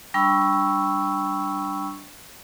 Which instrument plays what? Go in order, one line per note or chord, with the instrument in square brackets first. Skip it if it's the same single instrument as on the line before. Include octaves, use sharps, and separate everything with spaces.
[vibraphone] G3 D4 G5 B5 C#6 E6